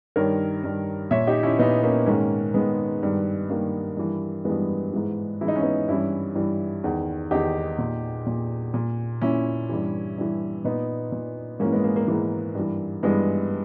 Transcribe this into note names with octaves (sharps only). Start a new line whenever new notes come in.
G2 D#3 A#4 C#5
G2 D#3
A#2 C#5 E5
D#4 G4
C#4 E4
A#2 B3 D#4
A#3 C#4
G#2 D#3 A#3 C#4
G#2 D#3 G#3 B3
G2 D#3
G2 D#3 A#3
G2 E3
G2 E3 G#3 B3
G#2 E3
G#2 E3 D#4 E4
C#4
B3 D#4
G2 E3 C#4 E4
G2 E3
E2 D#3
E2 D#3 D#4 G4
A#2
A#2
A#2
A#2 C#4 E4
G2 E3
G2 E3
A#2 B3 D#4
A#2
G#2 A#3 C#4
E3
G#3 B3
A#3
A#3
G#2 E3 A#3
G2 E3
G2 E3 G#3 B3